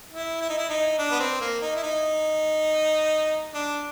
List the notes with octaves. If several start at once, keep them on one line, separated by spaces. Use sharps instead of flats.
E4
E4
D#4
E4
D#4
D4
B3
C4
A#3
D#4
E4
D#4
D4